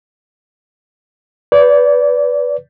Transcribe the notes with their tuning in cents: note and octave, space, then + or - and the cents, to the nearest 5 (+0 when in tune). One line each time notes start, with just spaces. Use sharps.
B4 +0 D5 -20